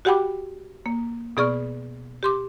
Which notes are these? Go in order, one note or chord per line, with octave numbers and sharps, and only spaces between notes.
F#4 G4 F#5 G5 B5 D6
A#3
B2 B3 G#4 D5 C#6 F6
G4 C6 D6